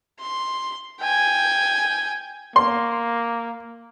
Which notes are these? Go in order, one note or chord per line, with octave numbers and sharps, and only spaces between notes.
C6
G5 G#5
A#3 C6